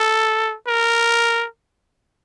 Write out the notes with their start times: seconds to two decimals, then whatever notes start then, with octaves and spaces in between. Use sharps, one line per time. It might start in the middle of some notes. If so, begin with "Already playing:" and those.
Already playing: A4
0.68 A#4